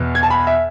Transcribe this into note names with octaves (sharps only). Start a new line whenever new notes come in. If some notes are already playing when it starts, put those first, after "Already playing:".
Already playing: E2 B2 B3
G#6
A5
B5
E5